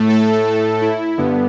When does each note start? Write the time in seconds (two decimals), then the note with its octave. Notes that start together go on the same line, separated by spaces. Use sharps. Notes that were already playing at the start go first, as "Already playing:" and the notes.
Already playing: A2 A3
0.08 A4
0.81 E4
1.17 G2 D3 B3